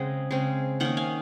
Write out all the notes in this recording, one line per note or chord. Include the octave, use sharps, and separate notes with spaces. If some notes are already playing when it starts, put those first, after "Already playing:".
Already playing: C#3 G#3 C4 D#5 F#5
C#3 G#3 C4
D#3 A#3 C#4 D#5 F#5
F5 G#5